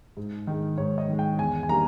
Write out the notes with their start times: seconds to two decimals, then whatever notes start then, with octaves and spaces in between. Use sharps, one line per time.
0.17 G#2
0.47 D#3 G#3
0.78 G#2 C#5
0.98 D#5
1.09 D#3 G#3
1.19 G5
1.38 E2 G#5
1.63 G#5
1.69 D#3 G3 A#3 A#5